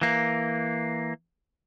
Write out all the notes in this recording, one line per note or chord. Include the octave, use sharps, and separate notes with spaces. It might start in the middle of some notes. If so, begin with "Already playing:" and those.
E3 A#3